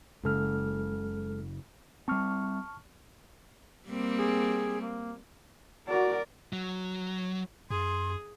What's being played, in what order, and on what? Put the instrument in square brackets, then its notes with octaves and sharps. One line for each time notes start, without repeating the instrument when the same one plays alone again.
[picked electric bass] F#1 C#3 [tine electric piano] G#3 A4 F6
[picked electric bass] G3 C4 [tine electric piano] A5 C#6 F6
[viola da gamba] G3 A#3 C4
[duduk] G#4
A#3
[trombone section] F#4 [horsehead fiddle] A#4 D5
[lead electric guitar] F#3
[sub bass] F#2 [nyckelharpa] G#4 [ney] C6